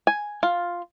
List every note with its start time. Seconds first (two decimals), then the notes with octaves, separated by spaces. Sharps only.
0.07 G#5
0.43 F4